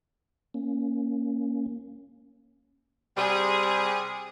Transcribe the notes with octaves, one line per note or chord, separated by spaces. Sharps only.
A#3 C#4
C3 G3 G#4